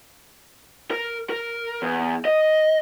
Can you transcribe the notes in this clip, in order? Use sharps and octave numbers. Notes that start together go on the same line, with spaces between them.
A#4
A#4
E2
D#5